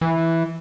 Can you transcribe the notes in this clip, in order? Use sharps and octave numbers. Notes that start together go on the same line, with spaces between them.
E3